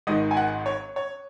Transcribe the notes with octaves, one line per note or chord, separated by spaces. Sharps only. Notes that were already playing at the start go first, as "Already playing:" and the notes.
G#1 G#2 D#3 D#5
G#5
F#5
C#5
C#5